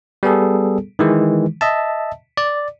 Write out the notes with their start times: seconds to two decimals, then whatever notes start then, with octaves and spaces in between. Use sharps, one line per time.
0.23 G3 B3 G#4 A4
0.99 D#3 E3 G#3
1.61 D#5 E5 A5
2.37 D5